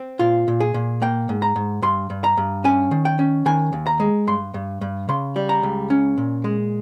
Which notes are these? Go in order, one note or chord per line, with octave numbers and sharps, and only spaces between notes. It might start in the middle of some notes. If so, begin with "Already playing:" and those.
Already playing: C4
A#2 F4
A#2
G#4
A#2
A#3 G5
G#2
A#5
G#2
G2 C6
G2
A#5
G2
C#4 G#5
D#3
G5
C#4
D#3 G#5
D#2
A#5
G#3
G2 C6
G2
G2
C#3 C6
G3
A#5
C#2
C#4
A#2
G#3